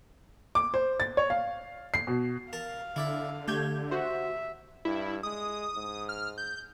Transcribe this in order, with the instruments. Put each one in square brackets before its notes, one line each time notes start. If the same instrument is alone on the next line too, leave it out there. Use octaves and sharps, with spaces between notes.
[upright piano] D6
C5
A6
C#5
F5
C7
B2
[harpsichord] A#4 A5 [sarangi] F5
[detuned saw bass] D3 [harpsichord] E4 D5 E5
[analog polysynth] A3 G6 G#6 [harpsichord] G4
[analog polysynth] F#4 C5 [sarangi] E5
[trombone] G2 [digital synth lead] E4
[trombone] G#3 [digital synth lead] D#6
[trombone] G#2
[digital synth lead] F6
G6